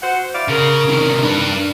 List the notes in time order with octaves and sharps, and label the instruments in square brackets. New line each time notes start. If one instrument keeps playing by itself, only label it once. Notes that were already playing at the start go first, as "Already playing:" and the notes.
[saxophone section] F#4 C5 F#5
E4 D5 F5
[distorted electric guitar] C#3 [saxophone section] A#4
[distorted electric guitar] C3 D#3
D4 B4